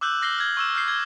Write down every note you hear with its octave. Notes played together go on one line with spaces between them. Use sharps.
D6 E6 F#6 G6 F#7
D6 F6 A#6 C7 F#7 G7
F6 G#6
C#6 E6 E7
F6 G6 C7
G#6 G7